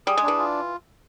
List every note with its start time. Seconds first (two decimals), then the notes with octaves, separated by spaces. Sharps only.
0.07 G3 G#4
0.17 G#3
0.23 D4
0.28 E3
0.39 F4